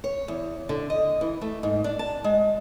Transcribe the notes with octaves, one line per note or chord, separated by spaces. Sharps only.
C#5
E2
D3
D#5
E3
A3
G#2
D4
A5
G#3